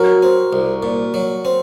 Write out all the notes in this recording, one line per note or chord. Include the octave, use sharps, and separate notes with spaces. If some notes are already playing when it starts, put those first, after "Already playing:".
Already playing: F#3 F#4 A#4
C4
C2
A#2
F#3
C4